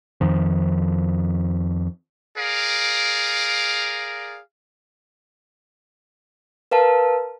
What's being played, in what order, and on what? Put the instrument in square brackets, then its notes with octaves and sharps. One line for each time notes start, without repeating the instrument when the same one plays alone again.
[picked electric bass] F2 D#3 F3
[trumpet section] G#4 A#4 D5 F5
[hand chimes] A#4 B4 F5 A5